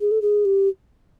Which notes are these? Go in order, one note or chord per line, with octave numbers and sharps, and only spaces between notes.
G#4
A4
G#4
G4